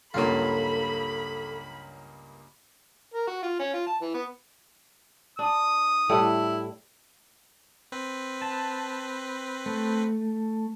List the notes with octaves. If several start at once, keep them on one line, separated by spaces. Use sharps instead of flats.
C#2 G2 F#3 A#3 F4 A4 B5
A#4
F#4
F4
C#4
F4
A5
E3
B3
D4 D#6
A2 G3 A3 E4
C4 B4
A5
A3